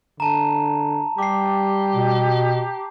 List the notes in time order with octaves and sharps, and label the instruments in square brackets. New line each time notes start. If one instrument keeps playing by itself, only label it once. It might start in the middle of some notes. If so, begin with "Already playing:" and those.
[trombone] D3 [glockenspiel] A5 A#5
[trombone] G3 [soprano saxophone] G4 [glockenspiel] D6 C7
[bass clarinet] B2